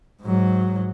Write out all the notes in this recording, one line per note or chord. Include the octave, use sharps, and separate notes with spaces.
G#2 F#3